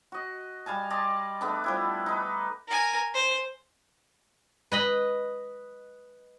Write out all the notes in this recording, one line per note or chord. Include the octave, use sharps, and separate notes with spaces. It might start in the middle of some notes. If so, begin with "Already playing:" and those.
F#4 D#5
G3 F5 G#5 A5
D5 D#5 A5 C6
A3 B3 D4
F3 G3 E4
D#4 B4
A#4 G#5
C5
B4 D#5 B5